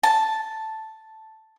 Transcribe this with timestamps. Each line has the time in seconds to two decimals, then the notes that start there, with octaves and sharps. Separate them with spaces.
0.03 A5